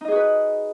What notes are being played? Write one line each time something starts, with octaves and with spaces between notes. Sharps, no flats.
D#4 F#4 G#4 B4 D#5